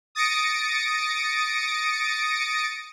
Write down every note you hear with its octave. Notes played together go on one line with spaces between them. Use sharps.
D#6 A6 A#6 C#7 D7